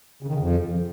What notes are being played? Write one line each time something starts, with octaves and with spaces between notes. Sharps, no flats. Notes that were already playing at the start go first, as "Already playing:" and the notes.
C#3
D#3
C#3
F2